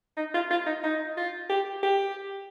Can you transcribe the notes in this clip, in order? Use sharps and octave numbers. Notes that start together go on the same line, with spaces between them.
D#4
F4
F4
D#4
D#4
F4
G4
G4